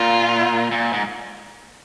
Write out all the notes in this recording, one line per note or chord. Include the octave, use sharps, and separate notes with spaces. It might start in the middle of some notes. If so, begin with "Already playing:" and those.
Already playing: A#2 F4
A#2
G#2